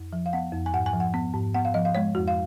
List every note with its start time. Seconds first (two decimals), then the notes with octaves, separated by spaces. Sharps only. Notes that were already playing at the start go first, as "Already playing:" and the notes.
Already playing: F2
0.12 F3
0.26 F5
0.33 B3 F#5
0.53 F2
0.66 G#5
0.73 G#2 F#5
0.86 G#5
0.93 F3
1.00 F#5
1.14 B3
1.34 G#2
1.55 B3 F#5
1.65 F5
1.74 F3 D#5
1.85 F5
1.95 G#3 C#5
2.15 F2 F#4
2.28 F5